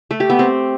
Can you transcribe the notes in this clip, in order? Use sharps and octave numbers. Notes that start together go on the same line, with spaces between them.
A3
G4
B3
C4